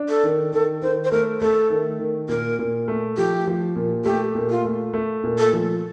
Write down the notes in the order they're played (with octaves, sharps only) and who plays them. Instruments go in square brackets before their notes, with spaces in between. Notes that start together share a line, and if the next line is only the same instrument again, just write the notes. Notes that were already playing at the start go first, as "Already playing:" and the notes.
Already playing: [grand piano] D4
[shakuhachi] A4
[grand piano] D#3
[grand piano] D#3 [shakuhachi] A4
[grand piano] D#3 [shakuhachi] C5
[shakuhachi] C5
[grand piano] A3 [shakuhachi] A#4
[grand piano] A3 [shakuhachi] A4
[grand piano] D#3
D#3
[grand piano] A#2 [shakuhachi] A#4
[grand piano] A#2
A3
[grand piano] F3 [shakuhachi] G4
[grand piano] F3
A#2
[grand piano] A3 [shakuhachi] G4
[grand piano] A#2
[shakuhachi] F4
[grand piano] A3
A3
A#2
[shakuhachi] A4
[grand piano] F3